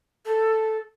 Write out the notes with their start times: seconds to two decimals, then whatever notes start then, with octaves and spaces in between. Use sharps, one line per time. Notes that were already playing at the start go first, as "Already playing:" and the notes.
0.25 A4